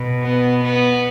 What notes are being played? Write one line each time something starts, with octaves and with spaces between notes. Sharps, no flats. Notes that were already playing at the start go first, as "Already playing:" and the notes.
Already playing: B2
B3
B3